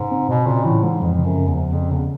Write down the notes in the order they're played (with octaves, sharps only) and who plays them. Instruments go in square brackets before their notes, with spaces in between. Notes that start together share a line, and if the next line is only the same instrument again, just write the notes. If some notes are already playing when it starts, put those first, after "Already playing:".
Already playing: [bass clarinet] G#2 [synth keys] C#3
[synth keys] C4
[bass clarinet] B2 [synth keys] C4
[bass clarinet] A#2 [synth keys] C#3
[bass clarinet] A2 [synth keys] E3
[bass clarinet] G#2 [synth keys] G#3
[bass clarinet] F2 [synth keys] F3
[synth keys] C#3
[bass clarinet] F#2
[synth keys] C#3
[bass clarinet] E2
[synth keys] F3
[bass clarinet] F2 [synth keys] C#3
[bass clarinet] E2 [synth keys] C#3